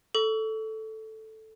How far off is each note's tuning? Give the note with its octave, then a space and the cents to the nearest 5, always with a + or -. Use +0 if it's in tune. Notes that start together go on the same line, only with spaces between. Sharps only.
A4 +0 C#6 +35